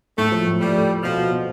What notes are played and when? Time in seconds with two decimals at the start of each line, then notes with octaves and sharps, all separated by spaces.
0.17 A2 A3
0.32 F3
0.47 A2
0.61 G3 A3
0.75 A3
0.89 A3
1.03 B2 F3
1.18 B2
1.31 B2